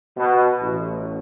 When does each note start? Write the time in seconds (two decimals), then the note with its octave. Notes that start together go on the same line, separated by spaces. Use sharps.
0.16 B2
0.61 A1